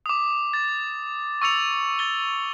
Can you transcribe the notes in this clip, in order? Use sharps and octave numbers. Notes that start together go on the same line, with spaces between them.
D6 D#6
A6
C#6 E6 A6 C#7 F7
A6 G7